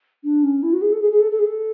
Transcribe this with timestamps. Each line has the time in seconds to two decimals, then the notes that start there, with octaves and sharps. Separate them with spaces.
0.23 D4
0.42 C#4
0.62 E4
0.72 F#4
0.81 G#4
0.92 A4
1.00 G#4
1.11 G#4
1.20 A4
1.31 A4
1.38 G#4
1.46 A4